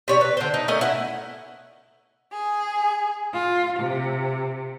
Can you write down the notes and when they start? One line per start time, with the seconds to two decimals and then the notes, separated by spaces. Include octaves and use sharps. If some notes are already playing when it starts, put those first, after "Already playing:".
0.08 C3 C#5 D5
0.21 B4
0.37 D3 C5
0.54 D#4
0.68 A3 C#4 A#4 D#5
0.81 E4 F#5
2.32 G#4
3.33 F4
3.79 C3